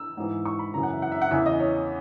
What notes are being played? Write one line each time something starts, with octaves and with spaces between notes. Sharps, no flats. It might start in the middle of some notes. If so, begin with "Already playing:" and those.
Already playing: E6
G#2 E3
C#6
B5
F#2 C#3 E3 A#5
F#5
E5
F#5
E5
F#5
E2 C#3 E3 E5
D#5
C#5